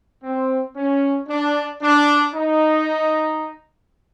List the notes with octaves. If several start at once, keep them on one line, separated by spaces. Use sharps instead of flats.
C4
C#4
D4
D4
D#4